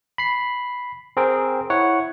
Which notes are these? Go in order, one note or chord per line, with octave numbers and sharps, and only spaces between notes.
B5 C7
C4 G#4 A#4 G5
E4 C#5 F#5